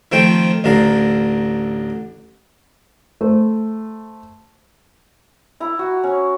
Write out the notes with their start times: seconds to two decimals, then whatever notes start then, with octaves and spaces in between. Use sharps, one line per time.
0.12 D#3 F3 A3 C4 F4 G5
0.64 A1 D2 D3 A#4 F5
3.21 A3 C5
5.60 E4 A#5
5.79 F#4
6.04 C#4